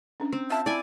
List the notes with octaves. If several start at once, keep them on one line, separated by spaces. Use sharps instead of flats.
C#4 D4
C4
F4 E5 A5
E4 D5 G#5